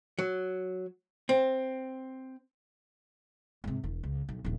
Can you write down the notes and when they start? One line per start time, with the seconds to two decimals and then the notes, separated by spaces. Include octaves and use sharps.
0.19 F#3
1.29 C4
3.64 G#2 C3
3.83 E1 E3
4.03 C#2
4.29 B1
4.45 D#1 A#1